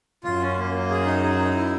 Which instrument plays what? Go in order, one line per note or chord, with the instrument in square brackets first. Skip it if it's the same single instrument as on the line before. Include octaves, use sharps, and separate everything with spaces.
[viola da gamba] F#2 [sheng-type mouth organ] F4
[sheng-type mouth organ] C#4
A#3
A#3
G#4
D#4
G#4
D#4
E4